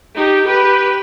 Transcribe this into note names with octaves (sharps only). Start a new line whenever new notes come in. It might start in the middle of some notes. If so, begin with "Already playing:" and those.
D#4 G4
G4 B4